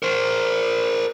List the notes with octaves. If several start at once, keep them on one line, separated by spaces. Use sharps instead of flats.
A#4 C5